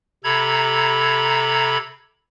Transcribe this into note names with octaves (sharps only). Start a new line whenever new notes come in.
C3 A4 A#5 B5 G#6